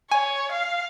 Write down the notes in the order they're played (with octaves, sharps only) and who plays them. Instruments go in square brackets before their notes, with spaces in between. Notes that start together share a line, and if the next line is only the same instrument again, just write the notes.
[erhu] C#5 [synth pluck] G#5
[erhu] F5